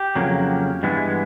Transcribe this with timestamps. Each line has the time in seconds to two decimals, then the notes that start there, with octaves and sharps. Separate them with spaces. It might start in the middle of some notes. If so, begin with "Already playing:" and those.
Already playing: G4
0.16 F2 C#3 F#3 A#3
0.83 G2 E3 G#3 B3